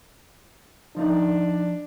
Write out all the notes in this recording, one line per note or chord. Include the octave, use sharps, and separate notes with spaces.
F3 D4 D#4 D5